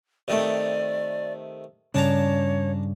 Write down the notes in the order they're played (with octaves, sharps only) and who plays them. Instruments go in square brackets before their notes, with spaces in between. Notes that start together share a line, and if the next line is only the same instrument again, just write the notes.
[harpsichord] C3 D#3 A3 [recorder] D5
[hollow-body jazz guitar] G2 C#3 [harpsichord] D4 A5 A#5 [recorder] C#5